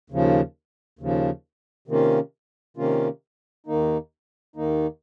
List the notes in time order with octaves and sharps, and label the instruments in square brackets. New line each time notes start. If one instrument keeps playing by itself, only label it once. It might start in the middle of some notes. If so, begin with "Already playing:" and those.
[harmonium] D#2 C#3 F3
D#2 C#3 F3
C3 D#3 A#3 C#4 F4
C3 D#3 A#3 C#4 F4
D#2 D#3 A#3 D#4
D#2 D#3 A#3 D#4